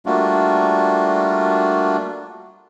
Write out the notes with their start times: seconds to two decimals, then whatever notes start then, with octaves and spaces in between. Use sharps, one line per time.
0.06 G3 A3 A#3 D4 F4 F#4